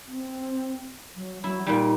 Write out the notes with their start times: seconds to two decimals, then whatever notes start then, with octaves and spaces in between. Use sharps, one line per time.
0.08 C4
1.16 F#3
1.44 F#3 E4
1.67 A#2 G3 D#4